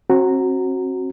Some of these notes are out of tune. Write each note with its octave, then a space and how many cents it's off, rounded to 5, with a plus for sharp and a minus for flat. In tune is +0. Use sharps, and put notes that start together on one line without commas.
C4 +40 F#4 +0 A#5 -10